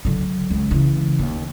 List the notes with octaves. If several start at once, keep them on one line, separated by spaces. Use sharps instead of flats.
D3 F#3
C#2
C#3 E3
D#2